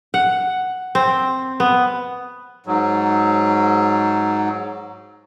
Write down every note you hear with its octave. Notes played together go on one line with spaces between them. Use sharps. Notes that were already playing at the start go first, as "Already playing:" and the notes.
F#5
C4
B3
G#2 F#3